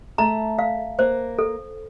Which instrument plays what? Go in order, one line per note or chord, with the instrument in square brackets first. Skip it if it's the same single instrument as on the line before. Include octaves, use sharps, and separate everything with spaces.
[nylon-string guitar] A3 [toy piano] A#5
[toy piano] F5
[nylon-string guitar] A#3 [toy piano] C5
[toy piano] A4